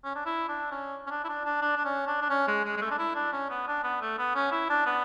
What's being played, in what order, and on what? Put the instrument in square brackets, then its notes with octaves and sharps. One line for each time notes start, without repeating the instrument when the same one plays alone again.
[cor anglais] C#4
D4
E4
D4
C#4
C#4
D4
E4
D4
D4
D4
D4
C#4
D4
D4
C#4
G#3
G#3
G#3
A3
D4
E4
D4
C#4
B3
D4
B3
A3
B3
C#4
E4
D4
B3